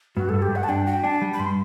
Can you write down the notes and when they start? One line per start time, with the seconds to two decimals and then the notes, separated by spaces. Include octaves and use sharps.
0.16 G2 F#4
0.29 G2 A4
0.42 G4
0.51 G2 F#5
0.64 A5
0.69 D4 G5
0.86 F#4 G5
1.04 D4 A5
1.22 G3
1.33 B5
1.39 G2 C6